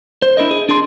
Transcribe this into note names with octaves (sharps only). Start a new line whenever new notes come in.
C5
D4 E4 A#4 D#5
G#4
D4 G#4 A5 C6